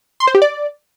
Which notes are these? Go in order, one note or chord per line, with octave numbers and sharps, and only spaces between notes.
C6
C5
G4
D5